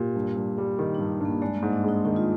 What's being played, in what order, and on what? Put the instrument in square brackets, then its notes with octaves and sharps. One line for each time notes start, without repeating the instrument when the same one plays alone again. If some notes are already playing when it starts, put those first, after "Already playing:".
Already playing: [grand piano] A#2 [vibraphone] G4
[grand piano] G2
G2
G3
[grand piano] D#3 [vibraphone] D#4
[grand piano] G2 [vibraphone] D4
[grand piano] G2 [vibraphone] A#3
[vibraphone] G#3 [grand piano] D4
[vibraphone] A#3
[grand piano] G#2
[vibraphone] D4
[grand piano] G#3 [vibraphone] D#4
[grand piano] D#3 [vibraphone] D#4
[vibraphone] F4